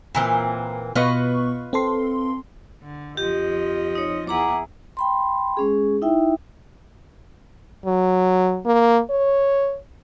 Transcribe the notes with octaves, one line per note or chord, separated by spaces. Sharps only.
A#2 E3 C4
B2 B3 F4 B4 D#5 C#6
C4 A4 C6
D3
F2 F3 G4 D#5
D#4 C#5
E2 E4 G#4 F#5 A#5 D6
G5 B5 C6
G#3 C#4 G#4
D#4 E4 E5 G5
F#3
A#3
C#5